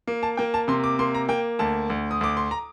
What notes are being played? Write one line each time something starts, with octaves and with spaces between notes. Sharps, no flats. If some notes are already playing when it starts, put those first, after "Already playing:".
A#3
A5
A#3 G5
A5
C3 C6
D6
A#3 C6
A#5
A#3 G5
D2 A5
D2
D#6
D2 D6
C6
A#5